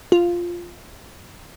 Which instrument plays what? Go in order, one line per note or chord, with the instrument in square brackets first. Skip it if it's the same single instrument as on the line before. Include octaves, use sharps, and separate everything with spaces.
[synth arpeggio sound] F4